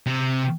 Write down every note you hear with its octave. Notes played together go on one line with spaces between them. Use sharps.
C3